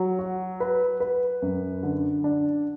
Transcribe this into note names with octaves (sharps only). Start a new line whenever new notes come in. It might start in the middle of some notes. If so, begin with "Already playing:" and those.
Already playing: F#3
F#4
B4
B4
F#2
D3
D4